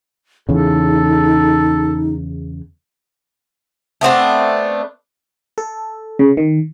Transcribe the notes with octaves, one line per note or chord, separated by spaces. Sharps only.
E2 C#3 D#4 A4
A3 B3 C4 D4
A4
C#3
D#3